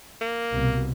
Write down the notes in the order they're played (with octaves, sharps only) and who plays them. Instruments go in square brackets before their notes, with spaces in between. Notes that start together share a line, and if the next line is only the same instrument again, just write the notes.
[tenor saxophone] A#3
[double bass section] C2 B2